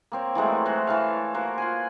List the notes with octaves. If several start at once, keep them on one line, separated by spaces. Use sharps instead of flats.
A#3 C4 C#5
E3 F#3 G#3 A3
F#4 C5 C#5
E3 A4 F5
A#3 F#4 C5
F4 F#5 G#5